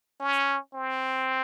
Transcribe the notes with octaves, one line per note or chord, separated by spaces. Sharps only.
C#4
C4